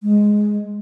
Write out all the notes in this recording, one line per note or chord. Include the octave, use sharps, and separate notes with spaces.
G#3